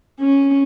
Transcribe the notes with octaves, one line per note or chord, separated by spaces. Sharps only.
C#4